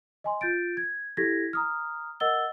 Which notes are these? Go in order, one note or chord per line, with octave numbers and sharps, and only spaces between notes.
D#5 G#5 C6
F4 G6 A6 D7
G#6
E4 G4 A4 G#6 A#6 B6
A#5 D#6 F6
A#4 D#5 F#5 E6 A6 G7